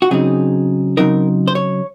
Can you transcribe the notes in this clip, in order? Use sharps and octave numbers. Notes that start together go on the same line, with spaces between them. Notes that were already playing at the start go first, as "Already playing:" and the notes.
F#4
C#3 F#3 C4 D#4 G#4
C#3 F#3 C4 D#4 A#4
C5
C#5